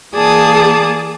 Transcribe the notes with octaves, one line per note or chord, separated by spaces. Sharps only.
E3 A#3 G#4 D5 A5 D#6